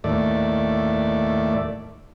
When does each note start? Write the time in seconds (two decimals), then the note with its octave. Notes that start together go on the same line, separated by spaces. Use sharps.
0.04 D#2 A2 A3 D5